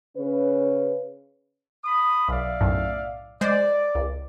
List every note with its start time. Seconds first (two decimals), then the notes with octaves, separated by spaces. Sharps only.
0.17 C#3 C#4 B4
1.83 B5 D#6
2.28 B1 D5 E5 F5
2.61 B1 F#2 A2
3.41 G#3 C5 D5
3.95 C#2